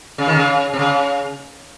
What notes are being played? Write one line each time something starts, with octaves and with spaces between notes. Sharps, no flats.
C#3
D#3
C#3
C3
C#3